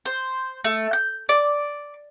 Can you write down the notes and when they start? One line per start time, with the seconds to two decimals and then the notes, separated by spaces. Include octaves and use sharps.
0.06 C5
0.64 A3
0.93 G6
1.29 D5